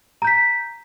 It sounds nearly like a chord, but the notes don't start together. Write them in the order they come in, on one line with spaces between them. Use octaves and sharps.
A#5 G6 B6